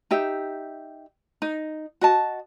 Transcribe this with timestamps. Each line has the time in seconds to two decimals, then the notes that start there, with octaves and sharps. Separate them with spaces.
0.11 D#4 G4 E5
1.42 D#4
2.01 F#4 D#5 A5